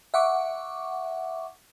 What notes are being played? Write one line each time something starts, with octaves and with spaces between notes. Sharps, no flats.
E5 F#5 C#6 D6